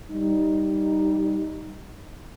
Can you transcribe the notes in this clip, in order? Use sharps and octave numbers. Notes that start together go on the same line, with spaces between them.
G3 D#4